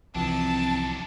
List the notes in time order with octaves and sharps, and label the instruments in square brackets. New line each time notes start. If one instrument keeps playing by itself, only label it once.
[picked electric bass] C2 E3 F3 [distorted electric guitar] F#2 D4 [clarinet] C4 [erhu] A5